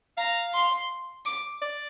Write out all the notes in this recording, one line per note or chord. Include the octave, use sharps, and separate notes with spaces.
F5 A#5
C6
D6
D5